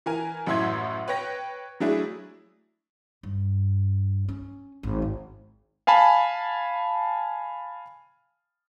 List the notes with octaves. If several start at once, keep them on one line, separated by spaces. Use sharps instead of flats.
E3 A#4 G#5
A1 F#2 A2 E5 C6 G#6
B4 C#5 G5 A#6
F#3 A3 D4 E4 G#4
G2
C#4
G#1
E4
F5 G#5 A5 B5